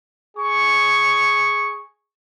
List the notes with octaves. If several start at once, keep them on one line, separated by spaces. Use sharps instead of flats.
G#4 C#6